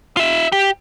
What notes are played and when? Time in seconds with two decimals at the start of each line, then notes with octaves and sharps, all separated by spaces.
0.17 F4 E5
0.52 G4